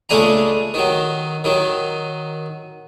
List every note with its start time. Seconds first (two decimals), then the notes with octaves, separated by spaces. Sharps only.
0.09 C#2 G#3 A3 D4 G#5 A#5
0.74 D#3 F#3
1.44 D#3 F#3